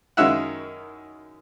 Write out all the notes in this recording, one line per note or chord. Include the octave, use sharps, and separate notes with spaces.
F#2 D#3 G#3 C#4 E4 E5 F#5